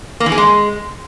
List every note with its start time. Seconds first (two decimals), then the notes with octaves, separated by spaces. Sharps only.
0.20 A#3
0.26 E3
0.32 G#4
0.38 G#3